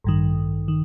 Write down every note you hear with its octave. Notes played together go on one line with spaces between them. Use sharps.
A1 G2 D#3
D#3